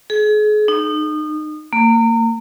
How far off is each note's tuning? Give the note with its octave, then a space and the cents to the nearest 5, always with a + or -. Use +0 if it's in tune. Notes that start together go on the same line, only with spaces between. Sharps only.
G#4 +35
D#4 -30
A#3 -30